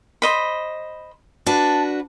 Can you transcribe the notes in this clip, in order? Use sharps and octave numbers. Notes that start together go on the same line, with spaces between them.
C5 D#5 B5
D4 F#4 B4 A5